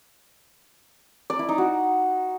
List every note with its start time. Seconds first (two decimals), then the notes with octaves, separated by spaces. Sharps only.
1.30 D5
1.39 E4
1.49 D#4
1.58 F#4